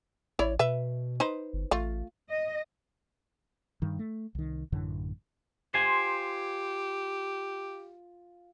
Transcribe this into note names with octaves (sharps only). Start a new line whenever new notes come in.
A1 E4 C#5 D5
B2 B4 E5
D#4 B4 C5
G1
A1 A3 F4
D#5
G2 D#3
A3
C2 D#3
A1 F#2 D3 E3
F4 G4 C5 G#5